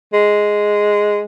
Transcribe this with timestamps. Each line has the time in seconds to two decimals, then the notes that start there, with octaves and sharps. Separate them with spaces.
0.13 G#3